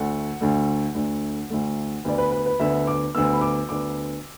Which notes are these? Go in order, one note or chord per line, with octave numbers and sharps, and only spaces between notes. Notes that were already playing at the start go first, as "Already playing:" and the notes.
Already playing: D2 D3 A3 F#5
D2 D3 A3
D2 D3 A3
D2 D3 A3
D2 D3 B3 D5
B4
B4
B4
D2 D3 B3 E5
D6
D2 D3 B3 E6
B5
D6
D2 D3 B3 D6